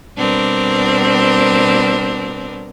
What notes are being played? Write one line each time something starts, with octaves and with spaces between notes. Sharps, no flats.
B2 G3 C4 D4 A#4